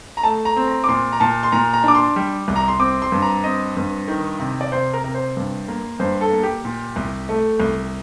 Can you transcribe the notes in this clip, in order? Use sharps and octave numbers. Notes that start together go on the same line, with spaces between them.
A#5
A3 A5
A#5
C4
A#5
D6
A#2 C6
A#5
A#2 A5
C6
A#2 A#5
A#5
D4 D6
C6
G3
C2
A#5
C6
C4 D6
C6
G2
A#5
C4 D#5
G2
D#3
C3
D5
C3 C5
A#4
C3 A#4
C5
G2
A#3
G2 C5
A4
A#3
G4
A#2
C2
A3
C2